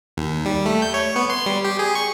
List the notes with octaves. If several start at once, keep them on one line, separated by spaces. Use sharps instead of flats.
D#2
G3
A3
G6
C#5
B3
C6
G3
G4
G#4
C#6